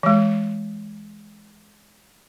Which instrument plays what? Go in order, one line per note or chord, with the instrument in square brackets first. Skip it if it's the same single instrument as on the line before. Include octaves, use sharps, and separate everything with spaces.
[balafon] E3 G#3